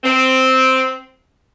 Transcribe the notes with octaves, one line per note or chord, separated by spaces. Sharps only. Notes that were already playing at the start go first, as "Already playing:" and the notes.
C4